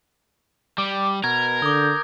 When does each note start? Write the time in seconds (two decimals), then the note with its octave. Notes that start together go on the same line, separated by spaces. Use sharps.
0.78 G3 D6
1.24 B2 A#4 G#6
1.62 D3 D6 D#6 G6